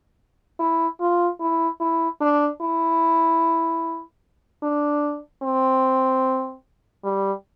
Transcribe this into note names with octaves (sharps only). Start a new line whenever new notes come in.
E4
F4
E4
E4
D4
E4
D4
C4
G3